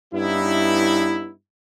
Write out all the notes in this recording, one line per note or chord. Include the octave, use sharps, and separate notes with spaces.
G2 B3 C#4 D#4 E4